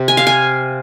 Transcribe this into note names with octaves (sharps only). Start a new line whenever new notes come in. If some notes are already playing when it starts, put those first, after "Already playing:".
Already playing: C3
G#5
F5
G#5